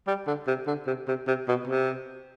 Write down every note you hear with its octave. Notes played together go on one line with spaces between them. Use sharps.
G3
D3
C3
D3
C3
C3
C3
B2
C3